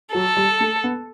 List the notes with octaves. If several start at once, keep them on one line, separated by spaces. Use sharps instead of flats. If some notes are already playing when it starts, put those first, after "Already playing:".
F#3 A4
G3
A3
B3